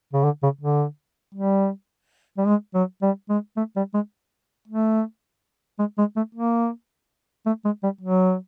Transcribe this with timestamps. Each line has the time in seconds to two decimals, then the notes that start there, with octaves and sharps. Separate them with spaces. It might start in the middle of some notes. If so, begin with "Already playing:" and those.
0.13 C#3
0.24 D3
0.43 C#3
0.61 D3
1.35 G3
2.38 G3
2.46 G#3
2.74 F#3
3.02 G3
3.29 G#3
3.57 A3
3.76 G3
3.94 G#3
4.68 A3
5.79 G#3
5.98 G#3
6.16 A3
6.35 A#3
7.46 A3
7.64 G#3
7.83 G3
8.01 F#3